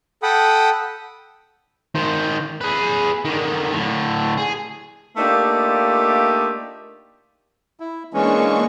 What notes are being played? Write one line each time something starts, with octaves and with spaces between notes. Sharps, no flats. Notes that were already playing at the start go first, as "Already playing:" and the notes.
A4 F#5 G5 B5 D#6
D#3 C5
G#4 B4
D3 D#3
A2 D3
G#4
A3 A#3 D4 D#4 F4 G4
E4
E3 G#3 A#3 C#4 D4 C#6